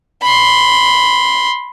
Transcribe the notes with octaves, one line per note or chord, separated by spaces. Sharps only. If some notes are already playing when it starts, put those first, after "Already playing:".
B5 C6